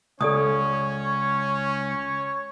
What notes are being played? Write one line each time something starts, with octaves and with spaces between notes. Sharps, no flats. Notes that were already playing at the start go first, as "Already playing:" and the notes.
C#2 C#4 A4 C#5 D5 D#6